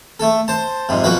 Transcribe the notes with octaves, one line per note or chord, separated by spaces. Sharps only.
A3 A4
C5 A5
F2 G#2 C3
B1 F3 F#4 B4